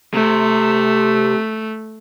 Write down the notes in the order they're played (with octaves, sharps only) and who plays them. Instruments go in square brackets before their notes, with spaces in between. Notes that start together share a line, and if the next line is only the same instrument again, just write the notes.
[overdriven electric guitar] C3 [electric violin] A3